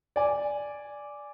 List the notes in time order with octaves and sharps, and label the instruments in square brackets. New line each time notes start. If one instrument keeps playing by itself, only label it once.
[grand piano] D5 G#5